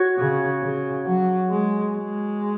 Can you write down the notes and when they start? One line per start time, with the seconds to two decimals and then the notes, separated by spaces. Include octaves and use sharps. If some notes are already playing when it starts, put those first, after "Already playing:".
Already playing: F#4 C#5
0.17 C#3
0.62 C#3
1.05 F#3
1.50 G#3
1.94 G#3